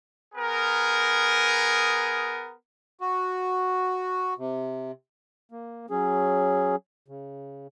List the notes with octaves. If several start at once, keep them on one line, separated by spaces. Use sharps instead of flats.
B3 G#4 A#4
F#4
C3
A#3
F#3 C#4 G#4
C#3